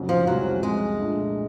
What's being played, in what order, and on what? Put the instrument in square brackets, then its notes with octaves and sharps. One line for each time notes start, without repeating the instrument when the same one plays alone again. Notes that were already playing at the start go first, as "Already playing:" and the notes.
Already playing: [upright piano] F1 F2 C#3 F#3
[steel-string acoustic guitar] F3
[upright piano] C2 C3 E3 G#3 C#4 [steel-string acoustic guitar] F#3
[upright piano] C2 C3 F3 [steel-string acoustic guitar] G#3
[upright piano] A#2 F3 A3 D4